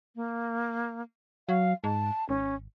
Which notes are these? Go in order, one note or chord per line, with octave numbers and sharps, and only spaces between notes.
A#3
F#3 F5
G#2 A5
G#1 C#4